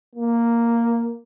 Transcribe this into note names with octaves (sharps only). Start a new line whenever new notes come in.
A#3